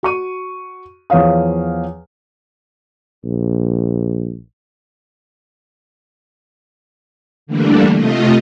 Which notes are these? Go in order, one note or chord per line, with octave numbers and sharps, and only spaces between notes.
F#4 C#6 D#7
E2 F3 C#5 F5 D#6
A#1
D3 E3 G3 A3 A#3 D4
C3 A3 F4 D#5